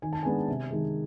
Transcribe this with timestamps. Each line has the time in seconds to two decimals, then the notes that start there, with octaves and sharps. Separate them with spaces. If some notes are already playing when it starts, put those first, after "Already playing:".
0.02 D#3 G#5
0.13 A5
0.23 G#3 B3 D4 G#5
0.48 C3
0.71 D#3 G#3